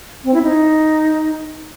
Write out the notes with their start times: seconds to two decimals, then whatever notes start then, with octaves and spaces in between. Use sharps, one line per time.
0.25 C4
0.34 E4
0.43 D#4